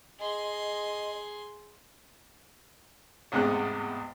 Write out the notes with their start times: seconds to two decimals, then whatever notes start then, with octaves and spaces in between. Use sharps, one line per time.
0.20 G#4 D#5 C6
3.32 A1 E2 G#2 C3 G#3 F#6